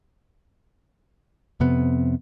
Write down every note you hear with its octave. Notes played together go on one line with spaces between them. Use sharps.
F2 C3 B3